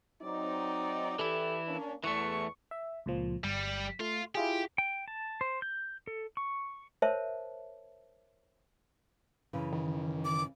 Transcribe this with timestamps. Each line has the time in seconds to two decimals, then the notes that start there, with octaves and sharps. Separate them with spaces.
0.22 F#3 C4 D#4 D5
1.19 E3 E4 G4 A4
1.68 A#3 C#4 D4
2.04 E2 E3 A3 C#6
2.71 E5
3.06 C#2 A#2 F3
3.44 G1 G3
4.00 A3 F4
4.35 E4 F4 G4 G#4
4.78 G5
5.08 A5
5.41 C5
5.62 G6
6.07 A4
6.37 C#6
7.02 A#4 C5 C#5 E5 A5
9.53 F#2 C#3 E3
9.73 D#3
10.25 D6